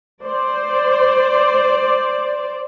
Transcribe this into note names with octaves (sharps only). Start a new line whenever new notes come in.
C5 D5